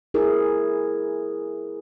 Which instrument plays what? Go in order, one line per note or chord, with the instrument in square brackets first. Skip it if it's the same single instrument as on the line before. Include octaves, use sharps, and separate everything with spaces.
[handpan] E4 G#4 A#4